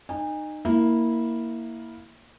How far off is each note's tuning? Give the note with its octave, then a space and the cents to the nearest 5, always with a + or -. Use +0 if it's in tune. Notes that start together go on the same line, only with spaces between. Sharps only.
D#4 -25 G#5 -35
A#3 +0 E4 -15